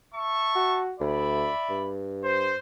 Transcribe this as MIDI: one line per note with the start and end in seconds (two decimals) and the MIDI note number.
0.15 0.82 76
0.15 0.82 81
0.15 0.82 85
0.56 0.94 66
1.00 1.49 38
1.00 1.88 74
1.00 1.88 76
1.00 1.88 83
1.70 2.55 43
2.24 2.58 72